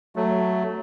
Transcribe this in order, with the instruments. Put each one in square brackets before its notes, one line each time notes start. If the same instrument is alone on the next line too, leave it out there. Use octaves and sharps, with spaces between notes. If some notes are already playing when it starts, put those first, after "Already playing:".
[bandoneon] F#3 A3